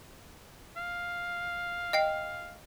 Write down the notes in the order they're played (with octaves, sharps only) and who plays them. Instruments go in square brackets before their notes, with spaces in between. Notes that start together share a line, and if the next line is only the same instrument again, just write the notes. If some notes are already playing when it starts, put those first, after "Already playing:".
[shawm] F5
[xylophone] D#5 G5 C7